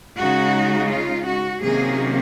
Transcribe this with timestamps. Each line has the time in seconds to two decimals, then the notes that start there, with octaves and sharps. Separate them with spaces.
0.16 C#3 G#3 D#4 F#4
0.89 F4
1.26 F#4
1.62 C3 D#3 F#3 A#3 C#4 G#4